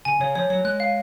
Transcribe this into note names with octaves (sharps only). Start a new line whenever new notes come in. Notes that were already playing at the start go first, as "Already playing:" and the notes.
C#3 G#5
C#3 C#5
F3 C#5
F#3 C#5
G#3 F#6
F5